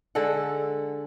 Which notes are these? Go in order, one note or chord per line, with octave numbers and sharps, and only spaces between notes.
D3 G#3 A4 F#5